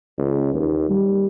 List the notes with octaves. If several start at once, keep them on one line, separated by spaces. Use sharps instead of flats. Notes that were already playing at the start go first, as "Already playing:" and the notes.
C#2
D#2
G3